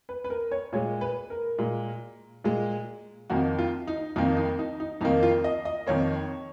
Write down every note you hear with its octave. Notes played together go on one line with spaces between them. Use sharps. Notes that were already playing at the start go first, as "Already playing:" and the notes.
B4
B4
A#4
C#5
A#2 G#3 C#5
B4
A#4
A#2 G#3
A#2 G#3
F2 D#3 A#3 F#4
F4
D#4
F2 D#3 A#3 D#4
D#4
D#4
D#4
F2 D#3 A#3 D#4
F4
D#5
D#5
F2 D#3 A#3 C#5